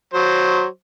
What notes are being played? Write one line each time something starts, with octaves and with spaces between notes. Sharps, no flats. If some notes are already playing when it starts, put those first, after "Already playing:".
F#3 C5